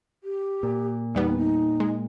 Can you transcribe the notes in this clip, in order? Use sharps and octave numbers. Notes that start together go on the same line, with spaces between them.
G4
A#2
E2 G3 B3 D#4
D#4
G#3